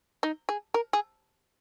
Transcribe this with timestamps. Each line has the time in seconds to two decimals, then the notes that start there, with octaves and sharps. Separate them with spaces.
0.23 D#4
0.49 G#4
0.74 A#4
0.93 G#4